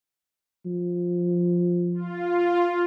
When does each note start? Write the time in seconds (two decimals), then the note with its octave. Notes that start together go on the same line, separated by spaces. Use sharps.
0.66 F3
1.94 F4